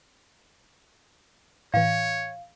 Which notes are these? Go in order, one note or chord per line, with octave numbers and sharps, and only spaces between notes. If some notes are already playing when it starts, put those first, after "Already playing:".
A2 E3 C#5 F5